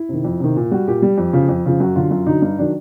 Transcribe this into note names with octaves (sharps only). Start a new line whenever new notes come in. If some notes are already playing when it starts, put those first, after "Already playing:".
Already playing: E4
C3 D#3
F2
C3 D#3
A#2
G3 F#4
A#2 G4
G3
F2
C#3 F3
F2
C#3 F3
F#2 F#4
D3 F#3 F4
F#2 F4
D3 F#3 D#4
G2 D#4
D#3 F#3 D4